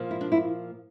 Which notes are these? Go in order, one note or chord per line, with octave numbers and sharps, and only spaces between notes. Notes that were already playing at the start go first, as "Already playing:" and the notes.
Already playing: A#2 F3 A#3
E4
D4
E4